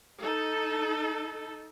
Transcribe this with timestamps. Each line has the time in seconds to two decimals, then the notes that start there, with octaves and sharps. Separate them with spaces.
0.21 D#4 A4